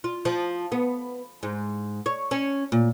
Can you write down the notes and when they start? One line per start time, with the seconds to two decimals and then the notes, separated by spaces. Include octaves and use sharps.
0.04 F4
0.25 F3
0.72 B3
1.43 G#2
2.06 C#5
2.31 C#4
2.72 A#2